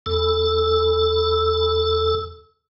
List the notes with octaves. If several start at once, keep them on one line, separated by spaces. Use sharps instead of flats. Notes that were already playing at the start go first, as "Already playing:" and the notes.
E2 A4